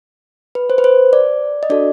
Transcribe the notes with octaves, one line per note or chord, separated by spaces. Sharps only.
B4
C5
B4
C5
D5
D#5
D4 F#4 A4 D5